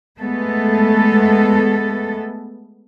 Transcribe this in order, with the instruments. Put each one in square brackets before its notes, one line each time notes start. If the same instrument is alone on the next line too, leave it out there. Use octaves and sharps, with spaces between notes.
[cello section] G#3 A3 B3 A4